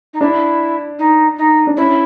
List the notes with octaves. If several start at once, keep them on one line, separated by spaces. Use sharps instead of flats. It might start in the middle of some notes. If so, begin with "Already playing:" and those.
D#4
D4 E4
D#4
D#4
D4
C#4 E4